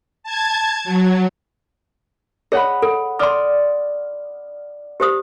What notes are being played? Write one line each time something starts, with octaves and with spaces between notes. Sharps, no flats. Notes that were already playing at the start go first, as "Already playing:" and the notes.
A5 G#6
F#3
G#4 C#5 D#5 F#5 B5
A4
D5 C6 D6 D#6 F6
G4 C5 D#6